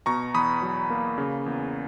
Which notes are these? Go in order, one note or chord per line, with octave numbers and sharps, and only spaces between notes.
B2 A#5 C#6
E2 B5 D#6
F#3
A#3
C#3
E2